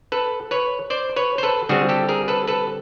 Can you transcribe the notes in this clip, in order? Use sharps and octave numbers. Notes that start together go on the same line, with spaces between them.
A4 B4
B4 C#5
C5 D5
B4 C#5
C5
A4 B4
D3 G3 C4 F#4 G#4
G4 A4
G#4 A#4
A4 B4
A4 B4